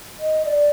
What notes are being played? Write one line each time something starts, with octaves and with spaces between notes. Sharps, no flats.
D#5
D5